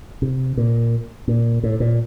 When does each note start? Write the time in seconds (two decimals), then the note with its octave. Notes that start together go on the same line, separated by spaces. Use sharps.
0.22 C3
0.57 A#2
1.28 A#2
1.63 A2
1.80 A#2